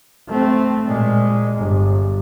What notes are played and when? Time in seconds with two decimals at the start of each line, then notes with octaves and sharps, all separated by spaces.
0.28 A3 C4
0.87 A#2 G#3
1.56 G1